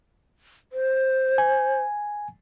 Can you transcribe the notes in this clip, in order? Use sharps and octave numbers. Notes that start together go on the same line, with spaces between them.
C5
G#5